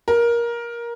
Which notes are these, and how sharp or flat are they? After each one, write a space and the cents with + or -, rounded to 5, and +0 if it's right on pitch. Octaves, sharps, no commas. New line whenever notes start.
A#4 +15